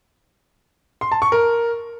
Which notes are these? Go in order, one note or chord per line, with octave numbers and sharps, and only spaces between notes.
C6
A5
C#6
A#4